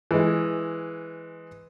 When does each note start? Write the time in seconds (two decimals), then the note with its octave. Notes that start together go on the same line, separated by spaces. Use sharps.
0.11 E3 G#3